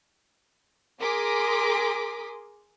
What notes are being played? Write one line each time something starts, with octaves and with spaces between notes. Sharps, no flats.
G#4 A#4 C6 D6 D#6 B6